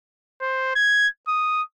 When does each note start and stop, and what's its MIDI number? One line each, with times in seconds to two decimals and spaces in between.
0.42 0.71 72
0.76 1.07 92
1.28 1.62 87